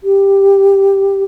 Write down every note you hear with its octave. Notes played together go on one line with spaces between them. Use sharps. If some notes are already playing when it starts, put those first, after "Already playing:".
G4